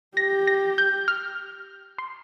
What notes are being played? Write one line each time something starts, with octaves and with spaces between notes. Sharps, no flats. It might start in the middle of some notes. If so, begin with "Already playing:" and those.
G4 A#6
A#6
G6
F6
C6